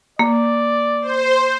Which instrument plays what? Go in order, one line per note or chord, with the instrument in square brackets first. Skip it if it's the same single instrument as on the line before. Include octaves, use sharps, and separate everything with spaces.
[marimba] A#3 [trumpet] D5
[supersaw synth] C5